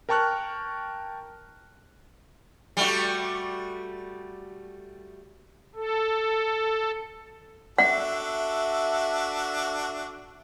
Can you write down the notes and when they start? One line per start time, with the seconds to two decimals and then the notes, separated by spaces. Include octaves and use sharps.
0.09 A#4 G5 A5 C#6 F6 F#6
2.77 G3 A3 F#4
5.75 A4
7.78 D4 F#4 A4 E5 F#5